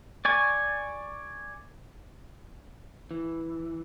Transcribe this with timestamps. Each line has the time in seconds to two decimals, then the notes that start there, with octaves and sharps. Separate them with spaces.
0.25 D5 G#5 C#6
3.11 E3